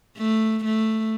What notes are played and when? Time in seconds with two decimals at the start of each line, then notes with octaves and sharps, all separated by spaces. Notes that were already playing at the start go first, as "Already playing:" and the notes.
0.17 A3
0.65 A3